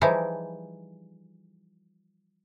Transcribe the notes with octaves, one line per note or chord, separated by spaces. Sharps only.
E3 F3 G3 D#4 E4 G#4